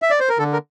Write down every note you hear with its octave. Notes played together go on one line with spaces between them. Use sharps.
E5
D5
C5
A#4
D3 A4
A#4